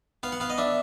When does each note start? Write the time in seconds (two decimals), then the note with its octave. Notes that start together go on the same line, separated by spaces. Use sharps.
0.23 B3 F5
0.32 F#5
0.40 B3 F5
0.50 D#5
0.58 D4 E5